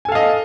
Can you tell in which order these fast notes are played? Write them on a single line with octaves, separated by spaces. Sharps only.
G#5 A4 F5 D#5